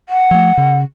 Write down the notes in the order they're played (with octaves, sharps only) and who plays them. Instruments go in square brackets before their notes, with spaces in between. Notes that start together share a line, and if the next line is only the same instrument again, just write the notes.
[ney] F#5
[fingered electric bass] F3 A3
C#3